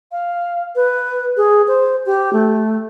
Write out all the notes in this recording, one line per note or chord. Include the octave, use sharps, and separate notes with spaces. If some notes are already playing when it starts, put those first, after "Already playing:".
F5
B4
G#4
C5
G4
A3